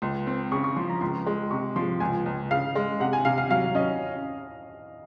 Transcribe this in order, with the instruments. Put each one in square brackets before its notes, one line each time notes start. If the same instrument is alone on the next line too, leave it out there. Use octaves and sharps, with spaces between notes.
[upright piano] C#2 [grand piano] C6
[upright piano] C4
[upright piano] C#3 [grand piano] C#6
[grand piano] C#6
[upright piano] F3 [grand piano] C6
[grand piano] A#5
[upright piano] C#2 [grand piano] C6
[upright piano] G#3
[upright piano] C3 [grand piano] C#6
[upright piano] F3 [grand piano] C6
[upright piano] C#2 [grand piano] G#5
[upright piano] C#2
[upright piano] C#3 [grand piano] F5
[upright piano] G#3
[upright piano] C3 [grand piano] F#5
[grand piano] G#5
[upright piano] C3 [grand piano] F5
[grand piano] F5
[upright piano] F#3 [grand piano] F5
[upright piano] C#4 [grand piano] D#5